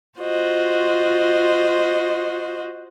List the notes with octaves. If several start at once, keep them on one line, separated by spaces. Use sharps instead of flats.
F4 F#4 C5 D#5